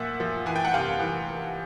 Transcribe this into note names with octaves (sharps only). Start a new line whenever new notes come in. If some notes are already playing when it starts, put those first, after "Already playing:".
Already playing: A#2 F3 E5 F#5
F3
E3 G#5
G5
F#5
C3 F5 G5
E3